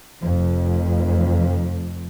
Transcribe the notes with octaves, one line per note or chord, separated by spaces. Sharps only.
F1 F2